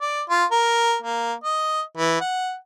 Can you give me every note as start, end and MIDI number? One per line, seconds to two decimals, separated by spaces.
0.01 0.21 74
0.30 0.44 65
0.52 0.96 70
1.02 1.33 58
1.44 1.81 75
1.98 2.17 52
2.21 2.55 78